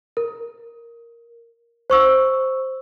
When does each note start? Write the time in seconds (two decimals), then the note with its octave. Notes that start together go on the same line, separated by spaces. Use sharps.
0.17 A#4
1.90 C5 C#6 E6